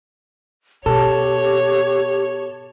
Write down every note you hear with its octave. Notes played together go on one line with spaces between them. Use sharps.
B2 G4 A4 C#5